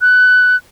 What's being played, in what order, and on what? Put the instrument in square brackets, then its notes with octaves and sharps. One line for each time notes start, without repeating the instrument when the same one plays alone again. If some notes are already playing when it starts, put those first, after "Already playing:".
[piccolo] F#6